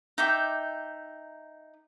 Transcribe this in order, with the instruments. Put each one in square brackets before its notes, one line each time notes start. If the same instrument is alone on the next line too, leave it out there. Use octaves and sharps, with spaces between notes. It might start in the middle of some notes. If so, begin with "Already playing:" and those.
[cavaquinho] D#4 E5 G5 D6